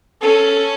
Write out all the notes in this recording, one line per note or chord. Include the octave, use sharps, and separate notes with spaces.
C#4 A4